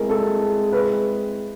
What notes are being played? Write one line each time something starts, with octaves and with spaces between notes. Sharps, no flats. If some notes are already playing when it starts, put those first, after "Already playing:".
Already playing: G#3 C4 E4 G#4 A#4
A4
B4